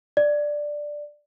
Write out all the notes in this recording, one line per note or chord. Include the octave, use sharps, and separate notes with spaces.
D5